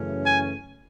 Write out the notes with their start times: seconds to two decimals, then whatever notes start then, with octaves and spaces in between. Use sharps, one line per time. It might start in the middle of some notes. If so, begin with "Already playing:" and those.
Already playing: F#2 C#3 E3 A3 C#4
0.24 G#5